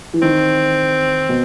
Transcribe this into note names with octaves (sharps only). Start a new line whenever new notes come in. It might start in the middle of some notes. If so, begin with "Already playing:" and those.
E3
D#3 C4
B2